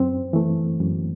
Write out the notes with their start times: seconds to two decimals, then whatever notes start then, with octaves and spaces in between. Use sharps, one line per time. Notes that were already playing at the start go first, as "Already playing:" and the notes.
Already playing: F#2 C4
0.33 E3 A3
0.80 F#2